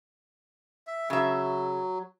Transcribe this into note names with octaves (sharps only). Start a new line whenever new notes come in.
E5
C#3 F#3 E5